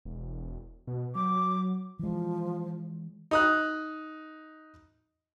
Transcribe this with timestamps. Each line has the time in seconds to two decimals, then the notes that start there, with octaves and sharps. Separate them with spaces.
0.05 E1
0.87 B2
1.15 F#3 D6
1.99 E3 F3 G#3
3.31 D#4 D#6 F#6